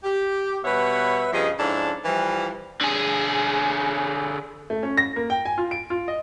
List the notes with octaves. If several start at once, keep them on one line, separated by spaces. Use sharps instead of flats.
G4
B2 G3 B4 C#5 E5 F#5
G2 C#3 F3 G#4 D#5
G#2 F3 C#4 D4 E4 A4
E3 F3 G3
D3 G#4
A3
C#4
A#6
A#3
G5
G#5
F4
D7
F4
D#5